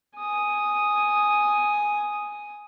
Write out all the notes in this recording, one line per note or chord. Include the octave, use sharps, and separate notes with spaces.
G#5 D#6